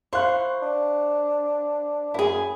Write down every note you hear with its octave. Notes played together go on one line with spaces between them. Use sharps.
E4 C5 F5 C6 C#6 F#6
D4
F#2 E4 G#4